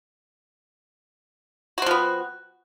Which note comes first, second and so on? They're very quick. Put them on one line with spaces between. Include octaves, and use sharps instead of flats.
F#4 C4 F3 B3